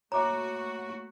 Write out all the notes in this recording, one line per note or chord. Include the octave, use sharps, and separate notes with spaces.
A3 A#3 F#4 C#5 E5 A#5 D6